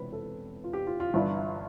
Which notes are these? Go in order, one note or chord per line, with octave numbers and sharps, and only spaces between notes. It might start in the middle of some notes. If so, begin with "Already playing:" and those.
Already playing: E1 E2 C3 B4
A4
F4
G4
F4
F4
G1 G2 E3 G3